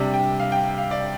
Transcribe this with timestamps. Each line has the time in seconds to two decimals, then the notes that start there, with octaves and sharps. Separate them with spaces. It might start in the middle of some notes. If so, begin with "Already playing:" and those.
Already playing: C3 G3 D4
0.14 G5
0.40 F5
0.52 G5
0.78 F5
0.91 D5